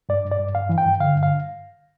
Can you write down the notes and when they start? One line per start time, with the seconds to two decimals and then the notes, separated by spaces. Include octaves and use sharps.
0.09 G2 D5
0.25 G2
0.31 D5
0.40 G2
0.55 G2 F5
0.69 E3
0.78 G5
0.85 G2
1.00 D3 F5
1.16 G2
1.23 F5